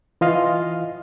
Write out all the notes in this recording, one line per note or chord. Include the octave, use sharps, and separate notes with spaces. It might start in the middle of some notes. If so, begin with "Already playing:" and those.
E3 F4 D#5 F5